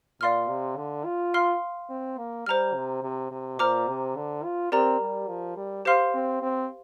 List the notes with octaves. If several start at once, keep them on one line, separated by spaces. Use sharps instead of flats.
A#2 D5 F5 C6 F6
C3
D3
F4
F5 C6 F6
C4
A#3
G3 C5 A#5 F6
C3
C3
C3
A#2 C5 A#5 D6 F6
C3
D3
F4
C4 G4 A#4 D5 A#5
G3
F3
G3
G4 C5 F5 C6 F6
C4
C4